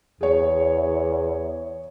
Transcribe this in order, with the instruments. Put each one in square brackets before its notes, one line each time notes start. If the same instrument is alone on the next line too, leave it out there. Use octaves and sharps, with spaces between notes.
[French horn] E2 [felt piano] G#4 C#5